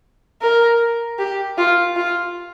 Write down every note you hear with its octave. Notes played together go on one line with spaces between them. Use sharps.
A#4
G4
F4
F4